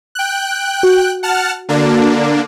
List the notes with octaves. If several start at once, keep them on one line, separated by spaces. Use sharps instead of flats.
G5 F#6
F#4
F#5 A5 F6
D3 A#3 D4